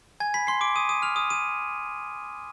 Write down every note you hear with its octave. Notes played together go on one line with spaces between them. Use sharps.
G#5 G#6
B5 B6
C6 C7
D6 D7
D#6 D#7
D#6 D#7
F6 F7
D#6 D#7
D#6 D#7